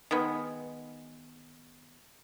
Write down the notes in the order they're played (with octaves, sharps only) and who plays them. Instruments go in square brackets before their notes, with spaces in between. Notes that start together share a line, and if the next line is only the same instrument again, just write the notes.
[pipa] D#3 G#3 B3